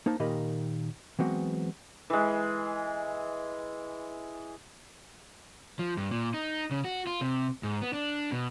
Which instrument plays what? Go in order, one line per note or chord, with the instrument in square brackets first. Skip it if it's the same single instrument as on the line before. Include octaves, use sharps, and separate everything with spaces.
[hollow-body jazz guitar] A#3 D#4 C5 A5
A#2 D#3 G4 A#4 D#5 B5
E3 F#3 G#3 B3 C4 F#4
[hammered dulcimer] E3 G#3
[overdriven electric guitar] F3
G2
A#2
D#4
C#3
F#4
F4
C3
G#2
B3
D4
B2